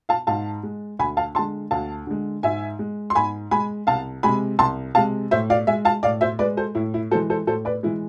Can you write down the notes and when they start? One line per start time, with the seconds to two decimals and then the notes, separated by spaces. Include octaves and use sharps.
0.09 F5 A5
0.27 G#2 F5 A5
0.63 G#3
0.99 D2 G#5 B5
1.17 F5 A5
1.35 D3 A5 C6
1.39 G#3
1.71 D2 F5 A5
2.07 D3 G#3
2.43 G#2 E5 G#5
2.79 G#3
3.10 C6
3.15 G#2 G#5 B5
3.51 G#3 G#5 B5
3.87 C2 F5 A5
4.23 C3 G#3 G#5 B5
4.59 C2 A5 C6
4.95 C3 G#3 F5 A5
5.31 A2 C5 E5
5.50 D5 F5
5.67 G#3 E5 G#5
5.85 F5 A5
6.03 A2 D5 F5
6.21 C5 E5
6.39 G#3 B4 D5
6.57 A4 C5
6.75 A2 E4
6.94 E4
7.11 G#3 A4 C5
7.15 E3
7.30 A4 C5
7.47 A2 A4 C5
7.65 B4 D5
7.83 E3 G#3 E4